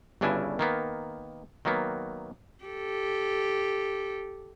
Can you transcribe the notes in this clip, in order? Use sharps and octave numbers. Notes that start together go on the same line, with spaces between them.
G1 G2 C#3 D4 E4 G#5
D#3 A#3 B3
D#3 F#3 A#3 B3
G4 A4